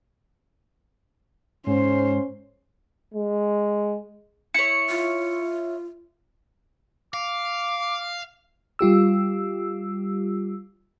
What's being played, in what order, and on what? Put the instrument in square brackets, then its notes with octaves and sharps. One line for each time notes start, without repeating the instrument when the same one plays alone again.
[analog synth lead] G#2 [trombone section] C#4 [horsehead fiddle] C5
[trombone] G#3
[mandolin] E4 C#5 [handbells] C#7
[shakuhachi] F4
[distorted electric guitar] F5 [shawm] D6
[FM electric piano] G3 F4 G4 E6